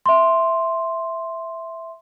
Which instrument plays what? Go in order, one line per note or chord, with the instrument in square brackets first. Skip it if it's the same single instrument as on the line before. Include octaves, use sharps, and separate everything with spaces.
[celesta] E5 C6